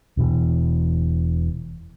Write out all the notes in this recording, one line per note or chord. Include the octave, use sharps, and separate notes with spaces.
E1 B2 E3